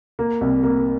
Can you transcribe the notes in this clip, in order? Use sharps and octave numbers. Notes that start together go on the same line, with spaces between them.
A#3
C2
A#3